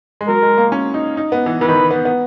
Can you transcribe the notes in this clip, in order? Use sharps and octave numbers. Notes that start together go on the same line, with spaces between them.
G#3
F#3 A#4
G#3
A#3
C#4
D#4
D#4
B3
E3
E3 B4
D#3
E3
B3
B3